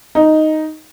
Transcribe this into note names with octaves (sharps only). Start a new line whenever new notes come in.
D#4